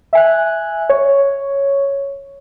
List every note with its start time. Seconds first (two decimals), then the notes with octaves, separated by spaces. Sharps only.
0.13 E5 G#5 F#6
0.89 C#5